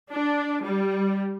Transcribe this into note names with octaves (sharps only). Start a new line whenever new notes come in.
D4
G3